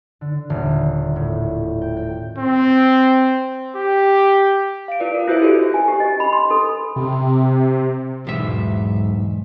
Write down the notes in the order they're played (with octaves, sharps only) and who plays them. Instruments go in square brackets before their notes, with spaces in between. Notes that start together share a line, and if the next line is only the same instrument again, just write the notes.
[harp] D3
D#1
A2
G5
G5
[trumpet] C4
G4
[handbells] F5 D7
F4 B4 D5
A#4
E4 F#4 B4 C5 E5 D7
G4 A4 B4 D#5
[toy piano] G#5
G4
D#5
B5
C6
A4
[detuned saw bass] C3
[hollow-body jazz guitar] B1 E2 E5 [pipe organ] G#2